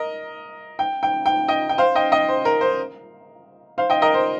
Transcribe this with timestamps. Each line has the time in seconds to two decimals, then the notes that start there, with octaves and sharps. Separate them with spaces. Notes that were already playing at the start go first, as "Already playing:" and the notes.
Already playing: A#4 D#5
0.79 G5
1.03 G5
1.26 G5
1.48 D#5 G5
1.69 G5
1.78 C5 F5
1.95 D#5 G5
2.12 D#5 G5
2.29 C5
2.45 A#4
2.61 C5
3.78 C5 F5
3.90 D#5 G5
4.02 A#4 D#5
4.14 C5